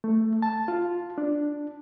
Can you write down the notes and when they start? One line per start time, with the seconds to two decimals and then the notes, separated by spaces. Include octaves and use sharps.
0.04 A3
0.42 A5
0.68 F4
1.18 D4